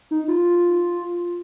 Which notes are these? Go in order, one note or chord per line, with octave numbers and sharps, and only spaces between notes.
D#4
F4